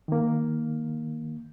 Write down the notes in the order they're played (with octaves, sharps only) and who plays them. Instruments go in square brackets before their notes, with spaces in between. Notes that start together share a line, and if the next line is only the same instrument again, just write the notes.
[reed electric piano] D#3 A#3